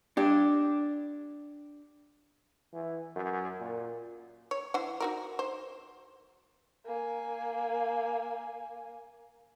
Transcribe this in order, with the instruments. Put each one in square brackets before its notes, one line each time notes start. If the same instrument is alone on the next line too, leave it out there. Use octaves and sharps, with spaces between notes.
[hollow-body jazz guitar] D4 G4
[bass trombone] E3
F#2
A#2
[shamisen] C#5
E3 C5 F#5
D#4 F#4 A#4
C5
[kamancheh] A#3 G#5